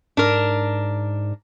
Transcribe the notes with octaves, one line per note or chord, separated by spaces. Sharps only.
G#2 D4 A#4